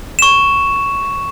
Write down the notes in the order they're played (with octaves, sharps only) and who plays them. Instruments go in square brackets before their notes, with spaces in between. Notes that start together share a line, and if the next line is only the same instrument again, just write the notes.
[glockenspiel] C#6 E7